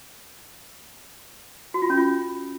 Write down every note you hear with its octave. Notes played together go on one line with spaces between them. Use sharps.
F#4
F4
C#4
F4